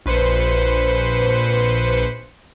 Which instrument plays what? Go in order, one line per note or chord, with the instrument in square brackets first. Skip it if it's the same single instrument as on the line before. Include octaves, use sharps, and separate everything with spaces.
[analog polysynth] A#1 B4 C5 C#7